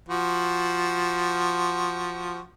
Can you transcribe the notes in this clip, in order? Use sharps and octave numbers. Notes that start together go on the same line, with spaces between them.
F3 F#4